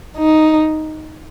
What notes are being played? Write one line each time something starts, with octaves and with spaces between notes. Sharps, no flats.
D#4